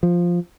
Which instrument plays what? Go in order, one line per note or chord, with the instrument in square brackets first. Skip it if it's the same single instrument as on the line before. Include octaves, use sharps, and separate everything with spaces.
[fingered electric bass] F3